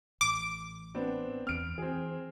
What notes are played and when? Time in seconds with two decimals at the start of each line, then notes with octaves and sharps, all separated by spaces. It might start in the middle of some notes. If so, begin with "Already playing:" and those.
0.21 A1 D6
0.94 B3 C4 D4
1.47 E2 C4 F6 D7
1.78 E3 C4 G#4